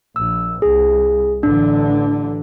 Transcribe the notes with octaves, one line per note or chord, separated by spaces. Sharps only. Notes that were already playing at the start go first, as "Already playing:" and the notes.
A#1 E6
C2 G#4
A1 D3 D4